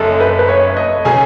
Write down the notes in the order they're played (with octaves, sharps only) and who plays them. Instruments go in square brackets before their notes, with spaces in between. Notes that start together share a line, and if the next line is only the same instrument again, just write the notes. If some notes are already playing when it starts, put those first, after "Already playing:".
Already playing: [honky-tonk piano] F#1 F#2 C#4 [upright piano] A4 D#5 E5
[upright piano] B4
B4
C#5
D#5
[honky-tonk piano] C#3 F#3 C#4 G#4 [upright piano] G#5